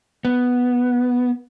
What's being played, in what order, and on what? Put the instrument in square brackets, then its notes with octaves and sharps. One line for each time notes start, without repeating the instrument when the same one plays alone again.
[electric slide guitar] B3